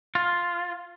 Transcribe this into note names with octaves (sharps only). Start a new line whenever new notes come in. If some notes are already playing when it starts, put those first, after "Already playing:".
F4